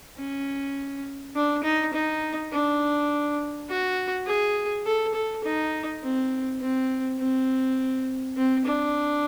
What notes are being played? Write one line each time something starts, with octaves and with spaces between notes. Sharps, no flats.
C#4
D4
D#4
D#4
D4
F#4
G#4
A4
A4
D#4
C4
C4
C4
C4
D4